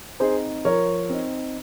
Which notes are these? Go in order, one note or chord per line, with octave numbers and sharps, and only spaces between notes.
C4 D#4 G#4 C5
F3 A#4 C#5
C4 D#4